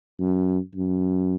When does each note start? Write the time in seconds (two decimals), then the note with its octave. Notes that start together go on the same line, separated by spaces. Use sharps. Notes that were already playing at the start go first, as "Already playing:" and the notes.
0.20 F#2
0.75 F#2